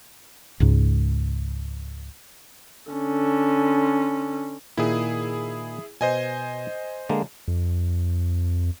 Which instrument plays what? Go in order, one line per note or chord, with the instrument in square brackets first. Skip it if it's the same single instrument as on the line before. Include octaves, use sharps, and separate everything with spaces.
[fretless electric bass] C#2 G#2
[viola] D3 C#4
[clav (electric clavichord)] A#2 D#3 [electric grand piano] E4 G#4
[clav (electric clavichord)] B2 [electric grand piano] C5 D#5 G#5
[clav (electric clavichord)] D3 G#3 A#3
[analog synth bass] F2